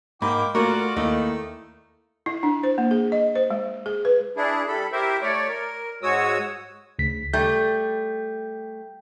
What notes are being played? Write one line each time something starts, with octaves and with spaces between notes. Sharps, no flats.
G#2 A#3 D#4 G5 B5 D6
A3 A#3 F4 F#4 A#4 D5 F5
D#2 D#3 A3 A#3 E4 D#5
E4
D4
C5
A#3
G#4
D#5
C5
G#3
G#4
B4
D4 E4 G#4
G3 A4 B5
E4 G4 A#4 C5 E5
A3 C#5 D5
A#4
G#2 G#3 F#4 C#5 D#6 E6
D2 C#3 B6
G3 A3 G5 G6